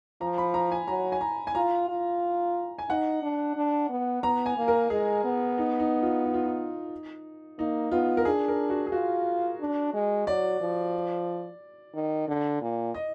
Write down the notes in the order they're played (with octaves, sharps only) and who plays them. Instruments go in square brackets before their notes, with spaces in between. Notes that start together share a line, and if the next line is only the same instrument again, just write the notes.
[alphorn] F3 [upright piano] A#5
[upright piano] B5
A#5
G#5
[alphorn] F#3 [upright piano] A#5
[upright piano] G#5
A#5
G#5
[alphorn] F4 [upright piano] A#5
[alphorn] F4
[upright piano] G#5
[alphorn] D#4 [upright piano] F#5
[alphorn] D4
D4
B3
[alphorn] B3 [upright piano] A#5
[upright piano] G#5
[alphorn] A#3
[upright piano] A#4
[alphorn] G#3 [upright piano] G#4
[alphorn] B3
[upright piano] D#4
D#4
F4
D#4
F4
D#4
[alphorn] A#3 [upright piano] D#4
[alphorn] B3 [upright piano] F4
[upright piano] A#4
[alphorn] D4 [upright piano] G#4
[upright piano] A#4
F#4
G#4
[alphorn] F4 [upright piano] F#4
[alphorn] D4
G#3
[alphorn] F#3 [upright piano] D5
[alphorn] F3
D#3
D3
A#2
[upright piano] D#5